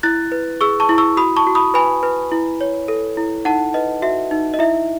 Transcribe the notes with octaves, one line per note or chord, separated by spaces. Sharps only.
E4 F#6 A6
B4
G#4 C#6 E6
A5 C#6
E4
C#6 E6
F#4 B5 D#6
A5 C#6
F#4
B5 D#6
B4 G#5 B5
B4
E4
C#5
A4
E4
D#4 F#5 A5
B4 D#5
F#4 E5
D#4
D#5
E4 E5